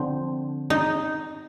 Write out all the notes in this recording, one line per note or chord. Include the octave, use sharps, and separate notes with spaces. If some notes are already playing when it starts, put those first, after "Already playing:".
Already playing: D3 F3 C4
D#4